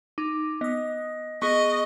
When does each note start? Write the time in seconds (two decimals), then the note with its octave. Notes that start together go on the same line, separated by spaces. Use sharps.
0.18 D#4 D6
0.61 B3 D#5 D#6
1.42 B3 G#4 D#5 C#6